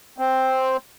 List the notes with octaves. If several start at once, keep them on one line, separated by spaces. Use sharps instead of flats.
C4